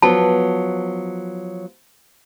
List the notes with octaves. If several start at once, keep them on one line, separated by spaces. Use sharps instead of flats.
F3 F#3 B3 A5